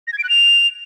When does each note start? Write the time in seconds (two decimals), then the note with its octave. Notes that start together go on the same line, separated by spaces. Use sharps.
0.07 A#6
0.13 G#6
0.18 D7
0.24 F#6
0.29 F7